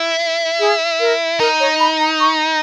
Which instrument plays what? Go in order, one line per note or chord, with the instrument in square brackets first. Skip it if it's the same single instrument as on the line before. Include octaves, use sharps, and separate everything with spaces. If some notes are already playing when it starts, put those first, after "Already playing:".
Already playing: [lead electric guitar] E4
[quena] G#4
A#4
[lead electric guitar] D#4 [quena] A#4
[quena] C#5
B5
A#5
C#6